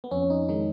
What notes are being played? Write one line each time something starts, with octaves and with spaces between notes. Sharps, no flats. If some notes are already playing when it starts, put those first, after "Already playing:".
B3
F2 C#4
D#4
D#3 G#3 D#4